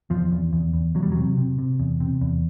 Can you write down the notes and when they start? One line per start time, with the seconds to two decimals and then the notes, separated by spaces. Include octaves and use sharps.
0.10 E2 F3
0.32 E2
0.53 E2
0.73 E2
0.95 E2 F#3
1.03 G3
1.12 C3 F#3
1.37 C3
1.59 C3
1.80 E2
2.00 C3
2.21 E2